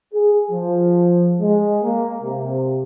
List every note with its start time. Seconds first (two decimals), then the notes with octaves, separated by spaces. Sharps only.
0.13 G#4
0.51 F3
1.40 G#3
1.82 A#3
2.23 C3